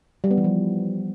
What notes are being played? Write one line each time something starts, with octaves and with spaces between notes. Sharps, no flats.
G3
B3
E3
F3